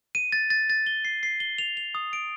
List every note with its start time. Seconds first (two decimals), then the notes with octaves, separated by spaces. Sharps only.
0.15 D#7
0.32 A6
0.50 A6
0.70 A6
0.87 G7
1.05 C7
1.23 C7
1.40 G7
1.58 F7
1.77 F7
1.95 D#6
2.13 D7